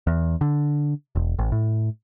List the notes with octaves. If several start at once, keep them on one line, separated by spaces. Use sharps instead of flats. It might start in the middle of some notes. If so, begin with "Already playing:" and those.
E2
D3
E1
A1
A2